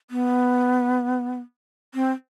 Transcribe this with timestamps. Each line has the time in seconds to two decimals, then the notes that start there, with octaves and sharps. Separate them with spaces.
0.10 B3
1.94 C4